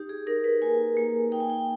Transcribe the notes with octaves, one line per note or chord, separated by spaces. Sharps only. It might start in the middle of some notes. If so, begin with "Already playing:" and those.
Already playing: D#4 G4
G#4
D#4 A#4
B4
A#3 G#5
A#3
D#4 G5
G#5
G5